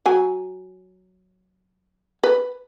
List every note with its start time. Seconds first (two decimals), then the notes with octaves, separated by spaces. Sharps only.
0.06 F#3 G#5
2.23 B4